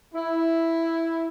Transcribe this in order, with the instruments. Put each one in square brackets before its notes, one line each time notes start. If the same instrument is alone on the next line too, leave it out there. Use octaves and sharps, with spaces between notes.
[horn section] E4